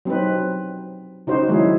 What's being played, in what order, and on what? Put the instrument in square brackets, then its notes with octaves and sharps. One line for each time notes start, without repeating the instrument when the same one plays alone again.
[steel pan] F#3 C4 D#4 B4
C#3 D#4 F#4 C5
D#3 F#3 G#3 E4 G#4